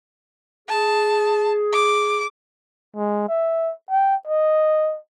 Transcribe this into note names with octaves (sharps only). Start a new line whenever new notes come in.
G#4 A5
D6
G#3
E5
G5
D#5